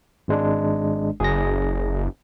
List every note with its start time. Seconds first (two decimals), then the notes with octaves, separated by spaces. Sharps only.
0.28 G#1 G#3 D4
1.20 F#1 G#4 A#6